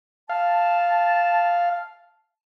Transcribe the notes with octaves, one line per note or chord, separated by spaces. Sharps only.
F5 A5